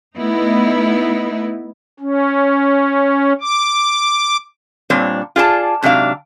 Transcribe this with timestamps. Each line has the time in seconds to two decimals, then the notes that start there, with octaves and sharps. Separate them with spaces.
0.16 A3 B3 D#4 E4
2.00 C#4
3.41 D6
4.90 A#2 G3 C4 D4 C#5
5.36 F4 G#4 D5 A5
5.82 G#2 C3 F#3 D4 F5